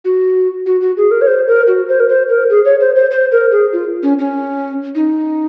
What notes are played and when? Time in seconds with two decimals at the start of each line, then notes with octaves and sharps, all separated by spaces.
0.05 F#4
0.66 F#4
0.81 F#4
0.97 G#4
1.11 A#4
1.22 C#5
1.27 C5
1.48 A#4
1.67 F#4
1.89 C5
2.00 A#4
2.09 C5
2.29 A#4
2.50 G#4
2.65 C#5
2.80 C5
2.96 C5
3.11 C5
3.32 A#4
3.52 G#4
3.73 F4
4.03 C#4
4.19 C#4
4.95 D#4